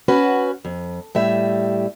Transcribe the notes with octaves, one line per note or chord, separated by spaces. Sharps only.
C#4 F#4 B4
F2
A2 G3 E5